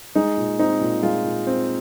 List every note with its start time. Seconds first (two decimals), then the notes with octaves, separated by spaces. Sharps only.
0.15 G#3 D#4
0.37 A#2
0.59 C4 D#4
0.81 A#2
1.03 G#3 F4
1.25 A#2
1.47 C4